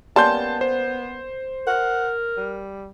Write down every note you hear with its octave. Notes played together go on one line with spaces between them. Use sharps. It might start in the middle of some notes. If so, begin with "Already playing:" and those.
G3 A#3 B3 C#4 A5 C6 G6
C5
A#4 F#5
G3